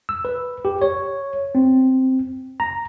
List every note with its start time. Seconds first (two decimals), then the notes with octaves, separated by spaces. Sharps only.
0.09 E6
0.25 B4
0.65 G4
0.82 C#5
1.55 C4
2.60 A#5